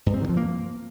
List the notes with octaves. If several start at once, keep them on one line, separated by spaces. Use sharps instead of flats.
G2
C4
D#3
F3
A#3